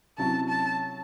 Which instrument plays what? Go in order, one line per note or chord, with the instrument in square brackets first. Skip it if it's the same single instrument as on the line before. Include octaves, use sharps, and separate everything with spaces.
[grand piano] C3 F#3 C#4 E4 [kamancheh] A5
[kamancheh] A5